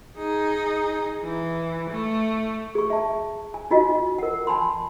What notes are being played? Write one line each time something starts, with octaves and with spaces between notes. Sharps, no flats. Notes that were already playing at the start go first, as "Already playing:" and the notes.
D#4 G#4
E3
A3
G#4 C#6
E5 A5
G#5
D#4 F4 F#4 D#5 G#5
A#4 F#5
G#5 A5 B5 C6